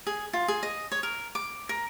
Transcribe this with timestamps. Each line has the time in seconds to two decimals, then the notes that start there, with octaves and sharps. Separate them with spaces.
0.07 G#4
0.33 F4
0.48 G#4
0.63 D#5
0.92 C#5
1.03 A#4
1.35 D6
1.69 A#4